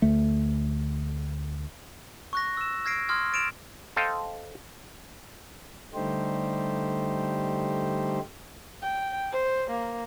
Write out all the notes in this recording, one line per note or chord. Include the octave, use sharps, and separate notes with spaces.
D2 A3
C#6 F#6 A#6
E6 E7
E6 F6 G#6 A#6 C7 D7
C6 D#6 F6 G#6
A6 D7 E7 F7
A4 C5 D#5 F5 G5
D3 G3 A3 D#4 G4 C5
G5
C5
A#3